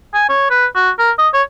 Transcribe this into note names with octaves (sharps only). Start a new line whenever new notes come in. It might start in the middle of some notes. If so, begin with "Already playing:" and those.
G#5
C#5
B4
F#4
A#4
D#5
C#5